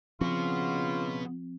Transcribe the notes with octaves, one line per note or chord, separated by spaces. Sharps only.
C#3 F3 B3 C4 F4 F#4